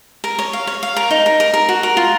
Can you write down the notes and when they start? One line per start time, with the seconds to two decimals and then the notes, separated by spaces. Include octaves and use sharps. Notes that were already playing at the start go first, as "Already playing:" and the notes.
0.24 A#4
0.39 C#5
0.53 F5
0.67 C#5
0.83 F5
0.96 A#4
1.11 D#4
1.26 A#4
1.40 A#4
1.54 A#4
1.69 F#4
1.83 A#4
1.97 F4